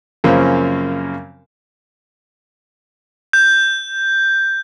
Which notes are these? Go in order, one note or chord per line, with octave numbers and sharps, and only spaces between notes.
F#2 C#3 F3 A#3 C4 C#4
G6